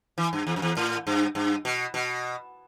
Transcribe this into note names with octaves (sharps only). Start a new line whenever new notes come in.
E3
G2
E2
F#2
E2
A2
G2
G2
B2
B2